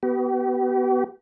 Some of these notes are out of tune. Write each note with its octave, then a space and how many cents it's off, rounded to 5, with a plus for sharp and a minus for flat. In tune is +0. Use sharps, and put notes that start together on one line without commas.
B3 +0 G4 -45